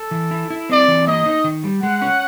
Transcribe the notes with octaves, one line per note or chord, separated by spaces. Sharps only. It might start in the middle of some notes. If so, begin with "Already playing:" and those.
Already playing: A4
E3
E4
E4
C4 D5
E3
A#3 D#5
D#4
D#3
G3
G#3 F#5
C#4